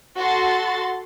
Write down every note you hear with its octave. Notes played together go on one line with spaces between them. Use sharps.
F#4 A4 C6 A6